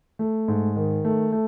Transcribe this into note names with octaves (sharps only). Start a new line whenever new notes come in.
A3
G#2
D#3
A3
A3